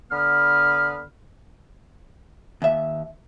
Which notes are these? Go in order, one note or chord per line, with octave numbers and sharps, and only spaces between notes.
D3 B3 B5 F6
D#2 E5